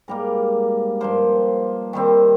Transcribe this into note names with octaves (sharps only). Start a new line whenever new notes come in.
G#2 G3 A#3 A#4
G2 F3 A#3 C5
D#3 G3 C4